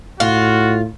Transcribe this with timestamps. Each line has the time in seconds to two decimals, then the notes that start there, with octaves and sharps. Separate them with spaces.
0.20 A2 F4 F#4